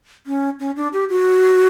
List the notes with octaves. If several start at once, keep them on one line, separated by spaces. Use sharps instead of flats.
C#4
C#4
D4
G4
F#4